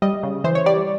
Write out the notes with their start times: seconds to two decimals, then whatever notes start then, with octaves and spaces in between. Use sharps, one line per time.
0.02 G3 D#5
0.23 C#3
0.44 E3 C5
0.55 C#5
0.66 G3 D5